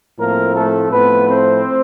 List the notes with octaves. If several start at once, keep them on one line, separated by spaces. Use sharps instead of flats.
A2 F3 A3 A#3 C4 A#4
A3 A4
A2 F3 A3 B3 C4 B4
C4 C5